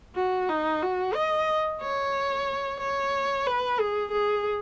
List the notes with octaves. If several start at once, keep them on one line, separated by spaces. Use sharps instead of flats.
F#4
D#4
F#4
D#5
C#5
C#5
B4
G#4
G#4